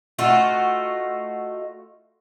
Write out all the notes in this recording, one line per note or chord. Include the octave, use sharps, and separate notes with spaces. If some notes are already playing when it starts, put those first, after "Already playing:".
A3 D#4 F4 F#4